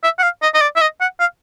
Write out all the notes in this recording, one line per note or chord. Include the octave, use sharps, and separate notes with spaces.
E5
F#5
F5
D#5
D#5
D5
E5
D#5
F#5
F5